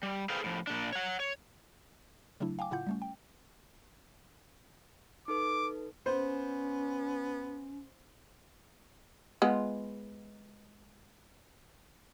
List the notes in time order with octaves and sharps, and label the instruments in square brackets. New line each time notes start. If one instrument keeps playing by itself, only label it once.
[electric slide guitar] G3
G#4 A4 B4 C5 F5 G5
A2 F3
A#2 D4
C#5 F#5
C#5
[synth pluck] C#3 F#3 A3 D4 E4
F5 G5 G#5 D6
A2 C#3 E4 F4 F#5 G6
G3 A3 C#4
G5
[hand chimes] D#4 A4 B4 [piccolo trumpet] D6
[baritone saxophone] B3 [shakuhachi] C#4 [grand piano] C5
[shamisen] G#3 B3 F4